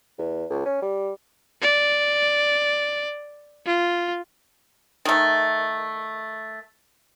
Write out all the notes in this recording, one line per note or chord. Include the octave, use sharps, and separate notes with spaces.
E2
C#2
C#4
G3
D5
F4
D#3 A3